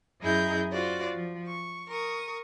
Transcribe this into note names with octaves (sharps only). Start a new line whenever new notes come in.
F#2 E4 G#4 D#5 A#5 G6
F4 F#4 C5 D5
F3
C#6
A#4 C#6 D#6